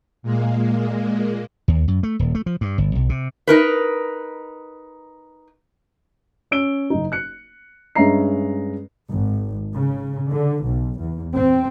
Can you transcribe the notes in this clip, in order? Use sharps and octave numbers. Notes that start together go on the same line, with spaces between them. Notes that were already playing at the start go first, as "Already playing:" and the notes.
A#2 G#3 A#3
D#2
F#2
A3
D#1
A3
F3
G2
G1
B1
C3
D#4 A#4 B4
C#4 E6 D7 G7
F#1 D#4
F#6 C#7
G2 G#3 C#4 E5 A#5 C7
G#1
C#3
D3
B1
E2
C4